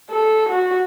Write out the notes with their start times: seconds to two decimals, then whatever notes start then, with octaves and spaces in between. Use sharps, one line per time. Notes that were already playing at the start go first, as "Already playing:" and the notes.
0.10 A4
0.49 F#4